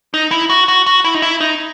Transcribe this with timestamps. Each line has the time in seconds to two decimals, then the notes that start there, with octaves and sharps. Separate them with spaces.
0.14 D#4
0.31 E4
0.49 F#4
0.68 F#4
0.86 F#4
1.05 E4
1.14 D#4
1.22 E4
1.40 D#4